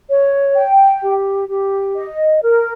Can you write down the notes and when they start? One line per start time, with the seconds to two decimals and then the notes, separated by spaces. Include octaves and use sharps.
0.09 C#5
0.55 G5
1.02 G4
1.49 G4
1.96 D#5
2.43 A#4